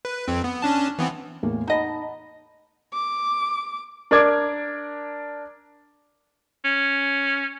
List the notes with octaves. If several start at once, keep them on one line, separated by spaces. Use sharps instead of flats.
B4
F2 C4
B3
C#4 D4 A5
E3 B3 C4
E2 A2 A#3
D#4 D#5 F#5 A5 B5
D6
D4 A#4 D5 D6 G#6
C#4